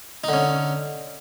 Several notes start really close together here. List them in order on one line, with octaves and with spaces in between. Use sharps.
D#4 D3 C#4